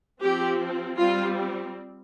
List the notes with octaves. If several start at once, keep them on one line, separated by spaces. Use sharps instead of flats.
F3 C4 G4
G3 C4 F4